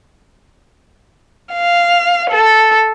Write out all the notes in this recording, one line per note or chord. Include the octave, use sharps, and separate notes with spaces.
F5
A4